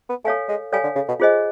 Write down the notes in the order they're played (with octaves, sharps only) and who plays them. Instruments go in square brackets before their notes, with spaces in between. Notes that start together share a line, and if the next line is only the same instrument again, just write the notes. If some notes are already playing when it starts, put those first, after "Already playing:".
[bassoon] B3
[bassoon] A3 [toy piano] A4 C#5 F5 G#5
[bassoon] G#3
[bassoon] G3 [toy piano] A4 C#5 F5 G#5
[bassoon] D3
C#3
B2
[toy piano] F4 G#4 C5 D#5 G#5